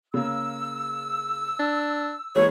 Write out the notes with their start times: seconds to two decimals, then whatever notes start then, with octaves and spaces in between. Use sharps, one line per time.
0.14 C#3 A#3 E6
1.60 D4
2.36 E3 G#3 A#3 G#4 C#5